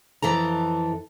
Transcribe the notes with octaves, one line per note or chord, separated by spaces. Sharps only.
F2 E3 A4 A#5